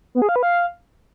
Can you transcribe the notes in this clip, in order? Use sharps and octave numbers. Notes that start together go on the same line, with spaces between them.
B3
G#4
F5
B4
F5